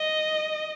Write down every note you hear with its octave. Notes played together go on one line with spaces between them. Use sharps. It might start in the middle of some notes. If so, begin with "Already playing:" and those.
Already playing: D#5